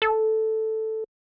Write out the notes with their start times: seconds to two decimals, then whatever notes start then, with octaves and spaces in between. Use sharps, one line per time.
0.02 A4